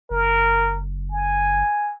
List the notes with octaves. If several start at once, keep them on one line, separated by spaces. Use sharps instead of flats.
F#1 A#4
G#5